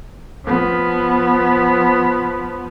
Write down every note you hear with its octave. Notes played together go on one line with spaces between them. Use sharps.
F3 B3